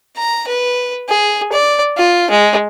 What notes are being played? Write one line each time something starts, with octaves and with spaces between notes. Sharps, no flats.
A#5
B4
G#4
D5
F4
G#3